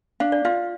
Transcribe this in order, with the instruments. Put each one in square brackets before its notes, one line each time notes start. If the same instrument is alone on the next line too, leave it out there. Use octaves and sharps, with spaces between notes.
[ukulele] D4 [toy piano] F5
[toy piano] D5
[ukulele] F4 [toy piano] F5